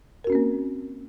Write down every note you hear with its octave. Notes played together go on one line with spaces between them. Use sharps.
A#3 C4 C#4 F#4 A#4